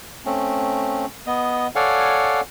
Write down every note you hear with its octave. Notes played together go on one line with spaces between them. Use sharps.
A3 C4 C#4
B3 D#5
A4 C#5 D5 F5 F#5 G#5